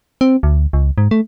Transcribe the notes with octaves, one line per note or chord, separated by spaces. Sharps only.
C4
D2
C#2
G#2
A3